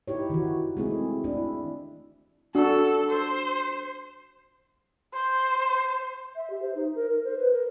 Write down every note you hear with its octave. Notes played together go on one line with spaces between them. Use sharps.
D#4 E4 G4 C#5
D#3 E3 F#4
G#3 A3 C4 E4 G#4
D4 E4
D4 F#4 A4
C5
C5
E5
G4
C5
D#4
A#4
A#4
C5
B4
A#4